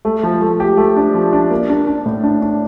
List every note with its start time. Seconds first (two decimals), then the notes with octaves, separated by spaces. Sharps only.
0.05 A3
0.23 F3
0.41 A3
0.60 G4
0.77 A3
0.97 D4
1.14 F3
1.33 D4
1.51 A#3
1.70 D4
1.87 D4
2.06 A2
2.24 D4
2.42 D4